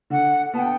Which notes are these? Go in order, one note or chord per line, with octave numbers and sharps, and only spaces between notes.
D3 F#5
B3 A5
G5